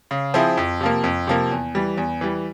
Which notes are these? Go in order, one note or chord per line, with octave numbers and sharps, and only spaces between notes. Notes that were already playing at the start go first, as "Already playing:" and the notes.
C#3
F3 C4 E4 G#4
F2
C3 F3 A#3
F2
C3 F3 A#3
E2
E3 G3
E2
E3 G3